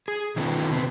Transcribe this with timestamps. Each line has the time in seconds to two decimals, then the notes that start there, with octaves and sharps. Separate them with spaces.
0.08 G#4
0.36 B2 D#3 A3 B3 C#4 F4
0.72 C3 B3 C4